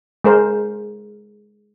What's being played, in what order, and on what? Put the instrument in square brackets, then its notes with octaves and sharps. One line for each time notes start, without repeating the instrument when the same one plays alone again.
[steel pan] G#3 A#4 C5